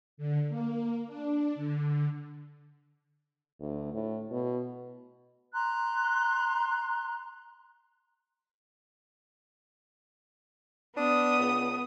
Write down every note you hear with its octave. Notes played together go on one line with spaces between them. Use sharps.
D3
A#3
D4
D3
D2
A2
B2
A#5 C6 F#6
B3 D4 D#6
C#2